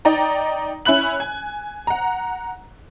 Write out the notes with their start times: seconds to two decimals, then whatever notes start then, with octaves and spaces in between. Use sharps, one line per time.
0.05 D#4 D5 G5 A#5
0.85 C#4 E4 B5 F#6 F#7
1.20 G#5
1.87 F#5 A#5